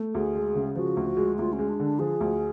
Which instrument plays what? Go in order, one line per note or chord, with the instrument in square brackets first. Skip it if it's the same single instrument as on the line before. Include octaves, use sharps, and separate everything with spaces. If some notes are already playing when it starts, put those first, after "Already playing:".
Already playing: [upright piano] A3
[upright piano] D2 [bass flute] G#4
[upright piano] G#3
C#3
[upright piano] F3 [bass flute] F#4
[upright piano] D2
G#3
[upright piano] D2 [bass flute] F4
[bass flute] C#4
[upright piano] G#3
[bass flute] D4
[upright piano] D3 [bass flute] D4
[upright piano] F3 [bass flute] G#4
[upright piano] D2